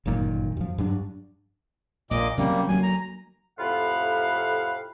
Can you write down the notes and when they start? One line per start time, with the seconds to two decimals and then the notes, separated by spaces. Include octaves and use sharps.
0.06 G1 F#2 A#2 D#3
0.57 F#2 F3
0.78 G2 F#3 D4
2.11 A#1 A#2 D#5 D6
2.38 C3 F#3 G3 A#3 C#4
2.69 D2 F#3 A#3 G#5
2.83 A#5
3.59 F2 A2 C3 F5 F#5 B5